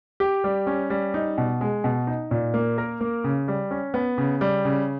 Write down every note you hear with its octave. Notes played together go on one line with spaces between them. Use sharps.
G4
G3
C#4
G3
D#4
B2
G#3
B2
D#4
A#2
A#3
A#4
A#3
C#3
G3
C#4
B3
C#3
G3
C#3